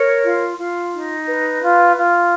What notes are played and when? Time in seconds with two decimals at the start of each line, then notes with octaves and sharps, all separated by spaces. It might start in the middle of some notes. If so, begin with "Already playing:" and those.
Already playing: A#4 C#5
0.24 F4
0.58 F4
0.93 D#4
1.27 B4
1.61 F4
1.96 F4